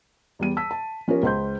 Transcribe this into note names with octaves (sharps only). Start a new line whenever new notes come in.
E2 G3 D#7
A5 E6 B6
A5
F3 C#4 G4 A#4
C#2 C5 C6 G6